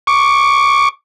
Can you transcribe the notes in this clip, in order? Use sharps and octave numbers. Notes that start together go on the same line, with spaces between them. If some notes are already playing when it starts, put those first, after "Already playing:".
C#6 D6